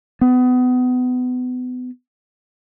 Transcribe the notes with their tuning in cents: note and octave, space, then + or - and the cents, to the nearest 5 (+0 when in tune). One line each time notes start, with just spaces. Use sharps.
B3 +30